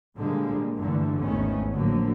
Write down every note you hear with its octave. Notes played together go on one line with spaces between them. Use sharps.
A#2 D3 F3 G3 G#3 A#3
G2 D3 E3 A3
G#1 E2 D#3 A3 B3 C#4
A2 D3 F3 F#3 A#3